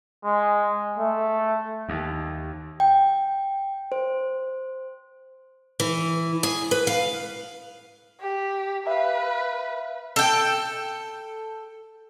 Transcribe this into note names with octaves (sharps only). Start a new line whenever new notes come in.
G#3
A3
D#2
G5
C5
E3
G#4
B4
F5
G4
B4 E5 F5
A4 G5